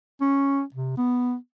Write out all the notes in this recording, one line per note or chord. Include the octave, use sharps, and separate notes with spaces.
C#4
C3
B3